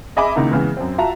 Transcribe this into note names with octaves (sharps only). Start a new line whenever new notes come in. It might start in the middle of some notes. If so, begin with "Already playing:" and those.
G#4 D#5 E5 G#5 B5 D6
C#2 D#3 A#3 D#4 E4 A#5
C#3 E3 G#3 B3
F#2 C4
F4 F#4 E5 A5 A#5